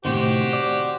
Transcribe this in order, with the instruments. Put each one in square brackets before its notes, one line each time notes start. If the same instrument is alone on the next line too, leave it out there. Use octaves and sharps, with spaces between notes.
[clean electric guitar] A2 C3 D#3 [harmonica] F#4 G4 C5
[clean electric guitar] D5